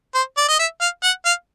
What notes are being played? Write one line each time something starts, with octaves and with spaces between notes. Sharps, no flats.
C5
D5
D#5
E5
F5
F#5
F5